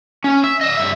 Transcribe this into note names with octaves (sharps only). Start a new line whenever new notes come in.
C#4
E5
D#5 E5
G2 E5